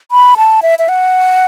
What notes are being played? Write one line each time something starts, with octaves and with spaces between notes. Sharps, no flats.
B5
A5
E5
E5
F#5